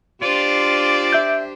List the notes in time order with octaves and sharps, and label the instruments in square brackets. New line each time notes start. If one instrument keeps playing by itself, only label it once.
[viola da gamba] D4 G4 C5 [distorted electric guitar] F4 [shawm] D5
[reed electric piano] E5 G6